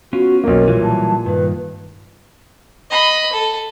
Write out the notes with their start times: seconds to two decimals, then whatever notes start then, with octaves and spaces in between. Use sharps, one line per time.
0.13 B3 C#4 F4 F#4
0.44 B1 A#3 A#4
0.68 A#2 E3 F#3 G3
0.83 A5
1.26 G2 D#3 B4
2.90 D#5 B5
3.33 A4